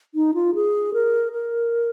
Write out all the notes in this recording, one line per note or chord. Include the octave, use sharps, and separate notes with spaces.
D#4
F4
G#4
A#4
A#4